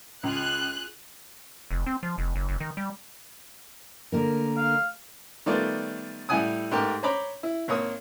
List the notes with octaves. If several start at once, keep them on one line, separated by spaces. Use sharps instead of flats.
C#2 F4 G#4 F#6
F1
C4
F3
F1
F#1
F#1
D#3
G3
D3 A#3 A#4
F5
D#3 G3 A3 B3 F4 D5
A2 G3 E4 F#5 G#5 D#6
G#2 A3 G4 A#4 G5 D6
C5 C#5 A#5 B5 D6
E4
G#1 A#3 C#5 C#6 D#6